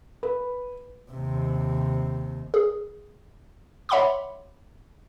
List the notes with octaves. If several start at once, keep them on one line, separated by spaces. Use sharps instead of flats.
B4
D#2 C3
G#4
C#5 E5 F#5 B5 C6 D6